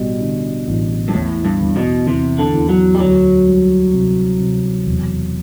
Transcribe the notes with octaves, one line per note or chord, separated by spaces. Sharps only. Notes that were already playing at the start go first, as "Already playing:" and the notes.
Already playing: A1 B2 G3
D3
A1
G2
E2 A2
G2
E2
B2
E2 C3
D3
E2
F#3
G3
D2 F#3
G3
C3
C3
E1